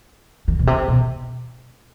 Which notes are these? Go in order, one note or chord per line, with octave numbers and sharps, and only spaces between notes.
D#3
B2
C3
B2